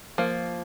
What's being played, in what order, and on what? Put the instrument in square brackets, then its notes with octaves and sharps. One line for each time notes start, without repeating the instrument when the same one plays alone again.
[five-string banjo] F3 A#3